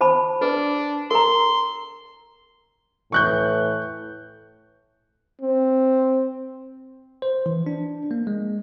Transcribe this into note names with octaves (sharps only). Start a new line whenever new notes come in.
C5 A5 B5
D4 B4
A#4 A#5 C6
A2 E3 C#6 F#6 G6
C4
C5
E3
D4
A#3
G#3